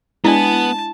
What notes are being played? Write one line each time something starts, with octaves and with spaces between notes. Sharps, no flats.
G#3 B3 D4 E4 G#5 A5